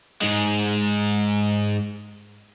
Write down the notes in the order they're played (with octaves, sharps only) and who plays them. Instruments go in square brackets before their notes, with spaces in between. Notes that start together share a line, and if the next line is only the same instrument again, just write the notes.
[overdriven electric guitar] G#2 G#3